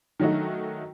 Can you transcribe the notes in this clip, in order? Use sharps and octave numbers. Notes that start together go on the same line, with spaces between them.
D#3 F#3 A3 D#4 F#4